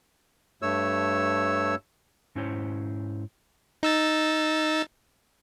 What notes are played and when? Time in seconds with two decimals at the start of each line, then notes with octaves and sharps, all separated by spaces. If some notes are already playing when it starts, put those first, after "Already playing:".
0.62 G2 A3 C#5 E6
2.35 G#2 C#4 E4 C5 C#5
3.83 D#4 E6 A6